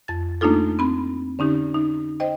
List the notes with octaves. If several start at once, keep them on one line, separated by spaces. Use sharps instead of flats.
F2 A6
A3 A#3 D4 D#4 F4 A4
C4 B5
D3 C#4 D#4 G4
D#4
C5 D#5 G5